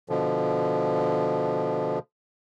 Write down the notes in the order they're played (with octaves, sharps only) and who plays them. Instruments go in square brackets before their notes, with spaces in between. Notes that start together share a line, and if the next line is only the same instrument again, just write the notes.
[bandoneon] B2 D3 F3